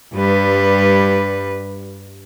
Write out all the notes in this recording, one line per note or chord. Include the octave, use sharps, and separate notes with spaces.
G2 G3 B4